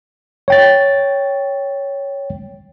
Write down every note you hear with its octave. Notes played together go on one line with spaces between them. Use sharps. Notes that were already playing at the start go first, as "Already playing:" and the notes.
C#5 G5 A6